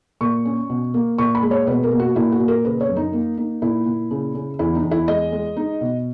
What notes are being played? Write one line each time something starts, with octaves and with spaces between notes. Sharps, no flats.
A#2 C#6
C#4
B2
A#3
A#2 C#6
B5
G#3
C#5
B2 B4
A#4
A#3
F#4
A#2 E4
F#4
A#2
A#4
C#3 B4
C#5
F#2
D#4
A#3
D#4
A#2 E4
A#2
C#3
C#3
E2 E4
D#4
E2
E4
G#3 D#5
G#3
D#4
B2